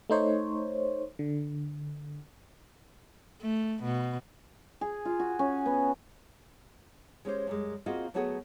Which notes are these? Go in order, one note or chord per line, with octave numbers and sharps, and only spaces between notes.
A3 D#4 C5 C#5
D3
A3
B2
G#4
F4
F#4
C#4
B3
G#3 C#4 G4 C5
F#2 G3 G#3
A#3 C4 F4 F#4 G#4 D#5
F#3 A3 B3 F#4 G#4 B4